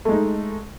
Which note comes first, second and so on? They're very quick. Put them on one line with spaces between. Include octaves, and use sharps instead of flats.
A3 G#3 D#4